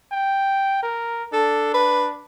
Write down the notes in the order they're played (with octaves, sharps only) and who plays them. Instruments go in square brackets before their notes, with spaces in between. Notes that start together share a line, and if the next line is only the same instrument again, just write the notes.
[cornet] G5
A#4
[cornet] D4 [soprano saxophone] A4
[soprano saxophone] B4